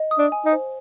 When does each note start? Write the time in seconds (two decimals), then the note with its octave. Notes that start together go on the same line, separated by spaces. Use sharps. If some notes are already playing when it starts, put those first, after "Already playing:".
Already playing: D#5
0.11 D#6
0.19 D4
0.32 G#5
0.46 D#4
0.52 C5